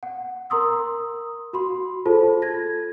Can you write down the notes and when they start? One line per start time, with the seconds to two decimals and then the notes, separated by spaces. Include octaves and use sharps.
0.03 F#5
0.50 A#4 A#5 C6 D#6 E6
1.53 F#4 B5 C6
2.06 F4 G#4 A4 C5 A5
2.42 G#6 A#6